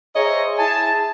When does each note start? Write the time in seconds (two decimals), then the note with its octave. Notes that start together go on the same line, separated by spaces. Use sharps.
0.16 G#4 C5 C#5 D#5 E5 A#5
0.58 E4 G#4 G#5 A5